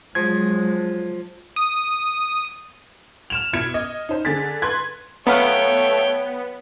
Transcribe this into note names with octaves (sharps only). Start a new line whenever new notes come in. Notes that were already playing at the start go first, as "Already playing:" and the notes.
F3 F#3 G#3 G#6
D#6
F6 E7 F7
B2 E4 G#6 C#7
D#5
D#4 C5
D3 G#4 A6 B6
B4 C6 F#6 G#6
F#3 A3 B3 C#5 F5 G5